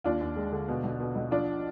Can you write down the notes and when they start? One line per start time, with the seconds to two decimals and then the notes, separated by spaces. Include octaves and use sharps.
0.04 D#2 D4 F4
0.21 D#2
0.36 G#3
0.52 D3
0.68 B2
0.84 B1
1.00 B2
1.15 B1
1.31 F3 D4 F4